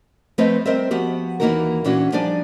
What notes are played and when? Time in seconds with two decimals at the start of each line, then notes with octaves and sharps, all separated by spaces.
0.38 F3 A3 C4 B4 C#5 D#5
0.66 G3 C4 A#4 C5 D#5 E5
0.91 F3 B3 F#4 G4
1.40 D#2 E3 A#3 D#4 F#4 A#4
1.84 A#2 E3 C#4 D4 F#4
2.12 F3 G3 D4 D#4 D5 G#5